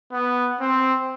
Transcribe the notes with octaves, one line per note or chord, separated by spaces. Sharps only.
B3
C4